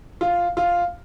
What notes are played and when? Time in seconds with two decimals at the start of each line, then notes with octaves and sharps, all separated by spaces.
0.21 F4
0.57 F4